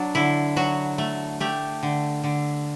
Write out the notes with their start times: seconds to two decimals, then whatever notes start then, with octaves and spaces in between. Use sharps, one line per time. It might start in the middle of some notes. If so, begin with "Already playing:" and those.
Already playing: F#3 D4
0.15 D3 E4
0.56 F#3 F#4
0.98 A3
1.40 A3 G4
1.83 D3
2.24 D3